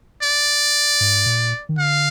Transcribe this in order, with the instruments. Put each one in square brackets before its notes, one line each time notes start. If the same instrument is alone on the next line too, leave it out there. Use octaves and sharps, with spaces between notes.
[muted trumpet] D5
[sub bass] G#2
A#2
D#3
[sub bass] D3 [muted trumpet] F5